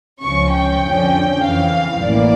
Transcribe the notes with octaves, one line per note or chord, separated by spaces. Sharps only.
C#2 C#3 F3 C#4 C#6
G5
F2 D3 F3 C#4
F2 C#3 E3 F5
A1 A2 E3 A#3 D5